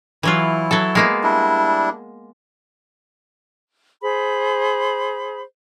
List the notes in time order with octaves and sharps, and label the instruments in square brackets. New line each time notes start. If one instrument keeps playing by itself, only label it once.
[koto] E3 F#3 F4 [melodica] E4
[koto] F#3 A4
G#3 A#3 B3
[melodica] G3 D4 E4
[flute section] G#4 C5 B5